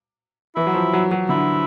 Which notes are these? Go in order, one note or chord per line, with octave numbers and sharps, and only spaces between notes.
E3 E4
F#3
F3
F#3
F#3
D3 E4